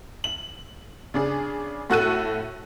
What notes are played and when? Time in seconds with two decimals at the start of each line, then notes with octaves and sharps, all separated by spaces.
0.24 F#7
1.14 C#3 D4 G#4
1.90 A2 F#4 A4 F#6 D#7